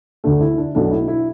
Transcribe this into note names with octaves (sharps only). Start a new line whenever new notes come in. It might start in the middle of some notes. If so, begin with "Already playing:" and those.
D2 D3 A3 D4
E4
D4
B1 B2 A3 D4
E4
E4